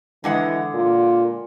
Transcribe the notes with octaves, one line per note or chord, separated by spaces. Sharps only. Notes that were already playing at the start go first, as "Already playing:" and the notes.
D3 E3 G#3 F#5
A#2